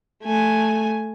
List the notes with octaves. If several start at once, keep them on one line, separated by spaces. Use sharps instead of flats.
A3 G#5